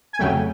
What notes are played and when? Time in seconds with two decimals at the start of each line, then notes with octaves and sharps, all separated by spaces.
0.13 G#5
0.19 F2 C#3 F#3 A3 G5